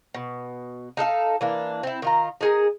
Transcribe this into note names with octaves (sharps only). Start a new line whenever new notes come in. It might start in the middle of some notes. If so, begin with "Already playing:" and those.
B2
D#4 A4 D#5 F5
E3 A#3 D4
C4 E4
D#3 F4 A#5
D#4 G#4 A#4